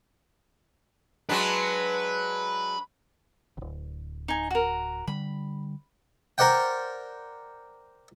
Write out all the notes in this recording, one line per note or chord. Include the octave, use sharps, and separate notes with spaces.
F#3 G#3 D4 B4
D1 G1
D#4 G#5
F#4 A#4
D3 G3 B5
A#4 C5 D5 F#5 G5